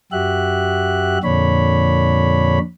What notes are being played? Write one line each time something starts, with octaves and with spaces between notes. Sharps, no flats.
F#2 F#4 G4 E5 F#6
F2 A#2 D3 D4 C#5 B5